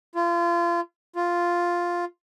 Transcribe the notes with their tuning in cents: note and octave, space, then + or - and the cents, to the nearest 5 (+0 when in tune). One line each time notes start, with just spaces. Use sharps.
F4 -30
F4 +0